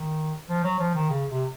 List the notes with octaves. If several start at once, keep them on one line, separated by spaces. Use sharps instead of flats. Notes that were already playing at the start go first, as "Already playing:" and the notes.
Already playing: D#3
F3
F#3
F3
D#3
C#3
C3